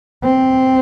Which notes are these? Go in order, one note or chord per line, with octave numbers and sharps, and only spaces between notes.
C4